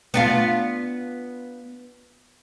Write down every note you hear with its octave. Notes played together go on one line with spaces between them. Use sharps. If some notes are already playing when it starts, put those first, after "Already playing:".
B3 D4 F4